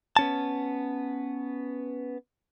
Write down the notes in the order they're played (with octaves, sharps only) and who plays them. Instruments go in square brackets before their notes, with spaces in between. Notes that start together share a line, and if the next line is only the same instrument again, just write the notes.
[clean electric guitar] B3 C#4 A5